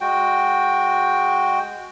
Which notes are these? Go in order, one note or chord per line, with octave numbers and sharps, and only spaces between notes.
G#3 F#4 G5